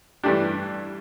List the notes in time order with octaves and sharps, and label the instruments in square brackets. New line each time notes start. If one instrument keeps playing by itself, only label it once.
[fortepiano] G2 E3 A3 D4 G4